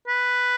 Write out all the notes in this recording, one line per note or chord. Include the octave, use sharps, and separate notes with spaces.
B4